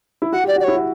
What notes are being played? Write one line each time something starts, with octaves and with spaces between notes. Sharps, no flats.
E4
F#4 F#5
G4
D5
F#4
D5
E4 C#5
F#4